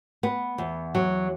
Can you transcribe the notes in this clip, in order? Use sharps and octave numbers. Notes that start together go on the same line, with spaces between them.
B3
E2
F#3